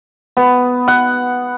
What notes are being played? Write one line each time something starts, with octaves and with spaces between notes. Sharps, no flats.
B3
F#5